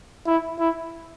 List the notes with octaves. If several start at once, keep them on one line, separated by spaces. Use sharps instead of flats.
E4
E4